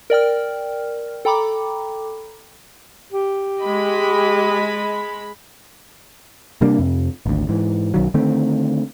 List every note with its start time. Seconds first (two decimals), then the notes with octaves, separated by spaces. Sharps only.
0.10 A#4 D5 G5 F6
1.25 A4 G5 A#5 B5 D6
3.12 G4
3.62 G#3 D#5 B5
6.61 C3 G3 A#3 D4
6.78 F2 C3
7.26 G#1 D2
7.49 G#2 E3
7.94 B1 D#3 F#3
8.14 D3 D#3 A3 C4